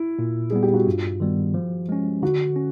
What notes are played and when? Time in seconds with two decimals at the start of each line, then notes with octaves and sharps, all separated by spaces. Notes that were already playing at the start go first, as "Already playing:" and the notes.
Already playing: E4
0.19 A#2
0.50 G3 B3 G#4
0.63 G4
0.74 F#4
0.86 G2 F4
1.20 D#3 G3 B3
1.54 F3
1.89 G#3 C#4
2.22 D3 F#4
2.56 C#4